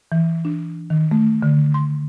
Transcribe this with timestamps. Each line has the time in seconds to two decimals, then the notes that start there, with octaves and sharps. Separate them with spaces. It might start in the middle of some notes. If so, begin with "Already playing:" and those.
0.12 E3
0.45 D4
0.90 D#3
1.11 A3
1.43 D3
1.74 C6